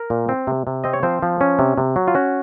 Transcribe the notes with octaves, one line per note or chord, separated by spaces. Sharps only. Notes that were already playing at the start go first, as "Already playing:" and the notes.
Already playing: A#4
A#2
C4
C3
C3
C4 D#5
C#5
F3 C4 C5
F3
C#4
C3
C3
F#3
F4
C#4 F#4